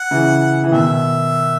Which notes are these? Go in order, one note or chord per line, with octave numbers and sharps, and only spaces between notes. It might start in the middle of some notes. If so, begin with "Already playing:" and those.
Already playing: F#5
C#3 E3
E3
B2 D#3 E5